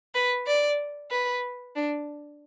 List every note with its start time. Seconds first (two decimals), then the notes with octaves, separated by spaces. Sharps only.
0.15 B4
0.47 D5
1.11 B4
1.75 D4